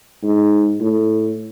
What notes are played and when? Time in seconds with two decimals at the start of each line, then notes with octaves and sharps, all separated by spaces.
0.24 G#2
0.81 A2